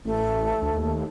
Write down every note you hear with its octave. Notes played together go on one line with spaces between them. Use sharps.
A1 A3
D2
D#2